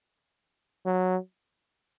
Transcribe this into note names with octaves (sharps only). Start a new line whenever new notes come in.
F#3